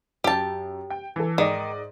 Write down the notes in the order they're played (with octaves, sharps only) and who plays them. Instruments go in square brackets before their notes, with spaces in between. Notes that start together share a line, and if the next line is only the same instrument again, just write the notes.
[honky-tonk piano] F#2 [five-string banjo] G4 A5
[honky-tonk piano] G5
E3 A4
[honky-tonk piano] G#2 D5 D#5 [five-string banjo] D#3